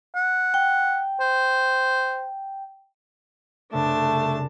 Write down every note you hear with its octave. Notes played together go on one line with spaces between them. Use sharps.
F#5
G5
C5
C2 F#2 C#3 A3 D4 A5